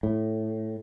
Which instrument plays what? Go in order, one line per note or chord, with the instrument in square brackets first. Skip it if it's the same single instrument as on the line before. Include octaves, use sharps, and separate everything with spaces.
[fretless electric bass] A2